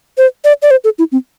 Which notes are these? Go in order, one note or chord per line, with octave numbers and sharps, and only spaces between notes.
C5
D5
D5
C5
A4
E4
C4